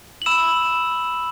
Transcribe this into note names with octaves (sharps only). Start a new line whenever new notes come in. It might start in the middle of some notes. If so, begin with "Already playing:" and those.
F#7
B5 E6 E7